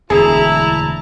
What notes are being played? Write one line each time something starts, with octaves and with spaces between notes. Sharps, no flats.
E1 D2 E4 G#4 A5 A#5